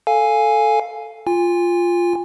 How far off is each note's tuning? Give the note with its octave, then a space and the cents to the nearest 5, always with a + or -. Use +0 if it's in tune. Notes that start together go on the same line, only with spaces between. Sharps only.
A4 +0 F5 +0 G#5 +0
F4 +0 G#5 -30